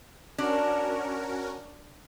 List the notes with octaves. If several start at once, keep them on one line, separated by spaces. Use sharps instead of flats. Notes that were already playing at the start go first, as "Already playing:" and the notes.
C#4 D4 F#4 A#4